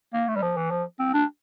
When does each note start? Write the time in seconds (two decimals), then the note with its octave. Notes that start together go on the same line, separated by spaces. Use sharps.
0.14 A#3
0.28 A3
0.36 G3
0.42 F3
0.57 E3
0.71 F3
0.99 C4
1.14 D4